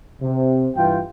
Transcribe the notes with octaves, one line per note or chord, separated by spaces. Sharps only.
C3
G2 E3 F4 G5